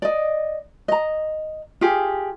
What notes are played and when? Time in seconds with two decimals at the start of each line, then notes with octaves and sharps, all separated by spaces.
0.02 D5 D#5
0.88 D#5 A#5
1.81 F4 G4 G#4